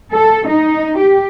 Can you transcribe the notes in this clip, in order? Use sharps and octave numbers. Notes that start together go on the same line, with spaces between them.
A4
D#4
G4